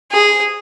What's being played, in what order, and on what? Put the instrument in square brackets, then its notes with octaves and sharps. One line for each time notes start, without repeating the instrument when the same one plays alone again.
[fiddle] G#4